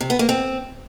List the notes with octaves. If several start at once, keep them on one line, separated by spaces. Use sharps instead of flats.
C3
B3
A#3
C4